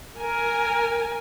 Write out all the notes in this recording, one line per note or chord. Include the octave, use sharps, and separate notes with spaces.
A#4 G#5